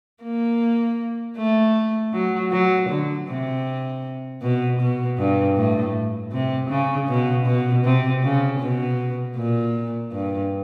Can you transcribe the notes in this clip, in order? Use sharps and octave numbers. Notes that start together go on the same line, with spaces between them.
A#3
A3
F#3
F#3
D3
C3
B2
B2
G2
A2
C3
C#3
B2
B2
C3
C#3
B2
A#2
G2